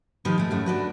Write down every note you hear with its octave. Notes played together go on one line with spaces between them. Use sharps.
D#3 F3 D#4 G4 B4
G#3 A3
F#2 A3
D4 F#4 B4